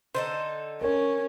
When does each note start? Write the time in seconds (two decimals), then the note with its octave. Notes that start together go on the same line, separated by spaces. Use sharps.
0.15 D3 D#4 A4 C5
0.82 C#4 A#4 C#5